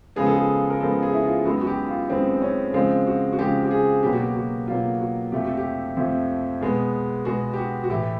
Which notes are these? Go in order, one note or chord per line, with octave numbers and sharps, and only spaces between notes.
C#3 F3 G#3 B3 G#4
A4
G#4
A#4
C#3 F3 G#3 B3 A4
G#4
E4
F4
F#2 D#3 G#3 B3 F#4
F#4
G4
F4
F#2 D#3 G#3 B3 C4
C#4
C#3 F3 G#3 C4
F#4
F#4
C#3 F3 G#3 G4
G4
G#4
B2 F#3 A#3 G4
F#4
G4
F#4
B2 F#3 A#3 F4
F#4
F2 C3 F3 A3 G4
F#4
G4
F2 C3 F3 A3
B2 G#3 B3
B2 G#3 B3 F#4
G4
F#4
F#4
A2 E3 A3 G4